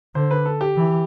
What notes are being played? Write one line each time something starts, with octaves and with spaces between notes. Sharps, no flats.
D3 C5
B4
A4
G4
E3